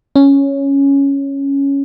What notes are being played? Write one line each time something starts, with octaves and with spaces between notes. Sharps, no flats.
C#4